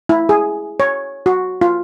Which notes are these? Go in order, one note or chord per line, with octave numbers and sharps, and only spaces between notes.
E4
G#4
C#5
F#4
F4